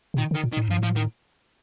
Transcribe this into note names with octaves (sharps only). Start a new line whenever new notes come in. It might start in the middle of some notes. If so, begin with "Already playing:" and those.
C3
A#2 D#3
D3
D#3
A#2
D#3
A2
G2 F3
A2 F3
D#3